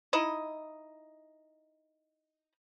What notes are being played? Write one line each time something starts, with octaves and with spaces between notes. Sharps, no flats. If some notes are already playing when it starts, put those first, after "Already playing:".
D#4 E4 D#5